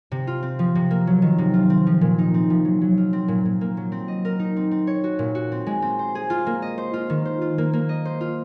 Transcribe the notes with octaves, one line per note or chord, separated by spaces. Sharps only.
C3
F4
C4
F3
C3
A#3
F#3
D#3
C3
F4
C4
F3
A#2
D#4
C4
F3
F#3
F#3
F4
C4
A#2
A#2
A#3
F#3
C4
D#5
A#4
D#4
C4
C4
C#5
F#4
A#2
F#4
C4
G#3
C4
C5
G#4
F4
A#3
D#5
C5
F4
D#3
C5
F4
A#3
A#3
D#5
C5
F4